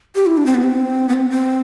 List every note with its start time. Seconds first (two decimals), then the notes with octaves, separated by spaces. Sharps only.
0.15 G4
0.26 E4
0.37 D4
0.46 C4
0.55 B3
0.64 C4
1.09 B3
1.13 C4
1.30 C4